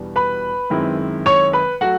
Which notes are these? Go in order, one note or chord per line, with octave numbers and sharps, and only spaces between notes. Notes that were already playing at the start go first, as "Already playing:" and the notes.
Already playing: E2 B2 G3 B3 D4
B4 B5
F#2 D#3 G#3 C4 E4
C#5 C#6
B4 B5
F#3 A3 F#4 F#5